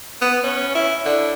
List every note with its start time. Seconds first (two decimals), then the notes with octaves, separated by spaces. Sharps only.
0.21 B3
0.44 C#4
0.75 E4
1.05 D3